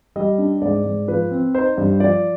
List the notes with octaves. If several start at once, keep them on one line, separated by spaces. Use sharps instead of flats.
G3 D#5
D4
G#2 D5
G#2
F3 B4
C4
D#4 C5
G2
F3 D5